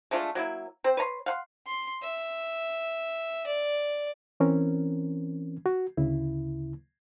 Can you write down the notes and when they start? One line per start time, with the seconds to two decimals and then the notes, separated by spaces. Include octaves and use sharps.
0.11 G#3 A3 D4 F4
0.35 F#3 A#3 E4
0.84 C4 C5
0.97 B4 C#5 A#5 C6
1.26 F5 F#5 C6
1.67 C6
2.02 E5
3.47 D5
4.40 E3 C4 C#4 A#4
5.66 F#4
5.97 D2 C#3 E4